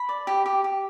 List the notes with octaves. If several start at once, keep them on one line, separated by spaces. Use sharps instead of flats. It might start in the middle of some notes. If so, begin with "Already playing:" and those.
Already playing: B5
D5
G4
G4
G4